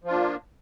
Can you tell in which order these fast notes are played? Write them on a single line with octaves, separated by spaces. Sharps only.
F3 F4 D4 A#3